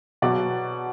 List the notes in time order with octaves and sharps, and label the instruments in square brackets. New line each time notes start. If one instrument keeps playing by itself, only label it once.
[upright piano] B2 F#3 D5